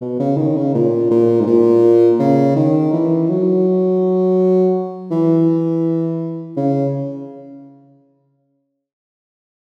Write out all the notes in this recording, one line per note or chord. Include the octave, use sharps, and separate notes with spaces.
B2
C#3
D#3
C#3
A#2
A#2
G#2
A#2
C#3
D#3
E3
F#3
E3
C#3